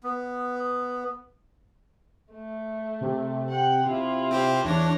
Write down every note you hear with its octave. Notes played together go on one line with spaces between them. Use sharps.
B3
A3
C3
F#5 G5
C3 E4 F4
C4 G4 C5
E2 E3 D4 C#5 A#6